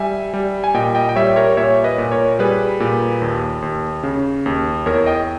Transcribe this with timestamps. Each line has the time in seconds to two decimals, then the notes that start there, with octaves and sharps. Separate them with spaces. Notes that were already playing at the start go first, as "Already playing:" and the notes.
Already playing: G3 E5 G#5
0.34 G3
0.64 G#5
0.74 A#2 D#5 G5
0.95 D#5 G5
1.09 G5
1.16 G3 C#5 E5
1.36 A#4 C#5
1.57 A#2 C#5 E5
1.84 B4 D#5
1.98 A#2
2.12 A#4 C#5
2.39 G3 G#4 B4
2.80 A#2
3.22 D#2
3.62 D#2
4.03 C#3
4.46 D#2
4.86 E2 A#4 C#5
5.06 D#5 G5